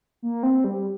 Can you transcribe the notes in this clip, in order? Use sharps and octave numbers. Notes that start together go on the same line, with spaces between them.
A#3
C4
G3